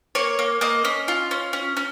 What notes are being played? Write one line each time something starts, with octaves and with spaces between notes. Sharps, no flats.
A#3 C#5
A#3
A#3 D#5
C#4
F4
C#4
C#4
C#4